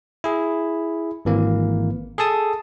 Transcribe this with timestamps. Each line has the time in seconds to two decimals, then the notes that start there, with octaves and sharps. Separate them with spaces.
0.24 E4 G#4
1.25 G#1 E3 A#3
2.18 G#4 A4 A5 D#6